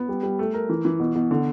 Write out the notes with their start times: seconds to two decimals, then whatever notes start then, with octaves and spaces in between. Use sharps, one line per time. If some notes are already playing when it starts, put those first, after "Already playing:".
Already playing: B3
0.09 G3
0.23 G3
0.39 A3
0.54 A#4
0.69 E3
0.85 E3
0.99 B2
1.15 B2
1.31 D3